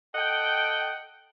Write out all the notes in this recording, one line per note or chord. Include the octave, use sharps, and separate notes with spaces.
A4 D#5 F#5 G5